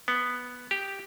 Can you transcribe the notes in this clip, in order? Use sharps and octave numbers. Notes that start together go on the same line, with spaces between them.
B3
G4